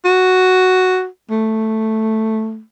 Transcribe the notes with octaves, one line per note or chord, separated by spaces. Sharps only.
F#4
A3